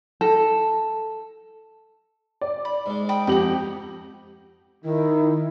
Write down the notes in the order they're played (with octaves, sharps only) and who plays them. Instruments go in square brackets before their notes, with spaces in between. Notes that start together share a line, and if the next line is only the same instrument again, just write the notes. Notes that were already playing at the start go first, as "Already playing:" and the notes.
[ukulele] A4
[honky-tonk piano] D5
[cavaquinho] B5
[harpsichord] G#2 G#3
[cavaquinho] G5 B5 D#6
[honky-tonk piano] F2 G4 F#7 [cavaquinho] D#4 F#4 D#6
[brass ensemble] D#3 [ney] E4